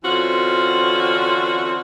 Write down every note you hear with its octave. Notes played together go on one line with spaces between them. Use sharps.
D3 E3 C4 C#4 F4 F#4